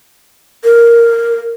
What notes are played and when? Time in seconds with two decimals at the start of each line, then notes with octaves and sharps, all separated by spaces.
0.64 A#4